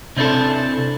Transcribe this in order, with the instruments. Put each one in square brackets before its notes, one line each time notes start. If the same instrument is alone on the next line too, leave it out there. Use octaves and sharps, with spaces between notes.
[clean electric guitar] C3 C4 D4 E4 A4